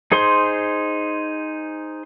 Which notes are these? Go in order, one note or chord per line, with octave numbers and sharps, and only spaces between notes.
D#4 G#4 C5 C6